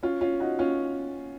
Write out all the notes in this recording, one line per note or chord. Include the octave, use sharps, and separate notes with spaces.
C#4 F4
C#4 F4
D#4 F#4
C#4 F4